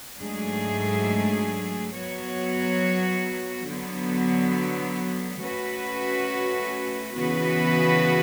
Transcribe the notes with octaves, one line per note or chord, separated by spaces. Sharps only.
G#2 F#3 A3 D4 G#4
F#3 B3 F#4 C#5
D3 F#3 B3
A3 C#4 F#4 B4
C#3 E3 B3 F#4 B4